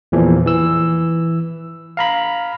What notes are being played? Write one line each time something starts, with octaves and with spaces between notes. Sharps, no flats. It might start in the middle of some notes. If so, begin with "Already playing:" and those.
E2 A#2 E3 F3
E3 E6
F5 A#5 B5